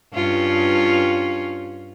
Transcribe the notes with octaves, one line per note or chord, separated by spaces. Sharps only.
G2 C#4 F4